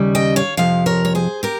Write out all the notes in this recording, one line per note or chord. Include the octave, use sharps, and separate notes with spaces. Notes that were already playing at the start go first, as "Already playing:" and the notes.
Already playing: D#2 C#3 G3
D#5 G5
C#5 F5
F2 C3 F3 F5
A#4 C#5
C#5
G#4 C5
G4 A#4